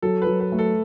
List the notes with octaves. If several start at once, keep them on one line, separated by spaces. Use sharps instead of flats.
F#3 A4
B4
F#3
B4
A3
A4